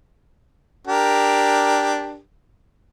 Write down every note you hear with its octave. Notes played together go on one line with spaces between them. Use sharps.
D4 G4 A#4